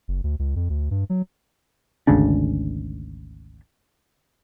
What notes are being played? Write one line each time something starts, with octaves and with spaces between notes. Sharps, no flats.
F#1
D2
C#2
F2
D2
G2
F#3
G#1 D2 C#3 D4